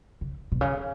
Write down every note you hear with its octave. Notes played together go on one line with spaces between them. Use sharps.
C#3
B2
C#3